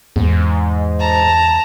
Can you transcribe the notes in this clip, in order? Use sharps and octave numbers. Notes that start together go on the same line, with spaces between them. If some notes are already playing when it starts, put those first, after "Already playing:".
E2 G#2
A5 A#5